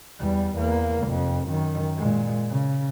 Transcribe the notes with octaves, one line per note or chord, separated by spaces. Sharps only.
E2 G3
E2 A#3
F1 F2
F#2 D#3
A#2 G#3
C#3